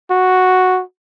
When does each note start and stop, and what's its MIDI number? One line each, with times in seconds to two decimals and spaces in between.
0.11 0.82 66